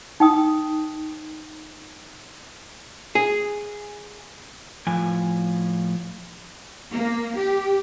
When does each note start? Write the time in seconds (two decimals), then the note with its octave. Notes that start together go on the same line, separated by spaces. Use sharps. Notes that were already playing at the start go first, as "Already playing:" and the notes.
0.20 D#4 G5 D#6
3.15 G#4
4.87 A2 F3 G#5
6.92 A#3
7.38 G4